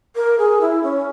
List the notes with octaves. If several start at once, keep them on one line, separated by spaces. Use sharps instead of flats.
A#4
G#4
E4
C#4